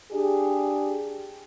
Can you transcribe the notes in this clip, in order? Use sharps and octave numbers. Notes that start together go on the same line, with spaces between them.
D4 G4 G#4